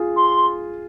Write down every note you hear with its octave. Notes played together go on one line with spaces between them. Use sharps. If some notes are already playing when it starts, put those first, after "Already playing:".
Already playing: F4 G#4
C6